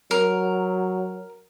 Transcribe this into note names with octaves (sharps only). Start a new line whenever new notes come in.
F#3 A#4